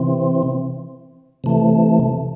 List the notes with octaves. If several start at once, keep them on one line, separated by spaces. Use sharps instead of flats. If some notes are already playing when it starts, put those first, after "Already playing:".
Already playing: C3 E3 C4
C3 E3 A3